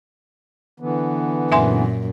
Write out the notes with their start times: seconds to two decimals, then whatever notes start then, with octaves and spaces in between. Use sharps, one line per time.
0.80 D3 E3 B3
1.52 F#2 A#2 E5 G#5 C6